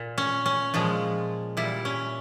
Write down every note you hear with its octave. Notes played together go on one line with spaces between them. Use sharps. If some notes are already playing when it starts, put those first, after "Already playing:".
Already playing: A#2
C#4
C#4
A#2 F3 G#3
A#2 G3 E4
C#4